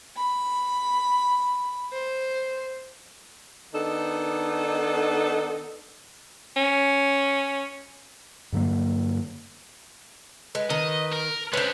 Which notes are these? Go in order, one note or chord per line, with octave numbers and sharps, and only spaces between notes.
B5
C5
D#3 B3 D4 D#4 A4
C#4
G2 D3 F#3 A#3
G#3 B4
D#3 D#5
A#4
G#3 C#4 D4 B4 C5